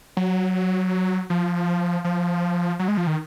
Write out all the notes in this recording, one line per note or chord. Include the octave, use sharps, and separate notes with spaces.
F#3
F3
F3
F#3
G#3
F3
D#3